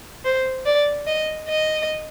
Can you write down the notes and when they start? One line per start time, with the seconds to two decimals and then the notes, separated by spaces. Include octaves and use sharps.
0.25 C5
0.66 D5
1.07 D#5
1.48 D#5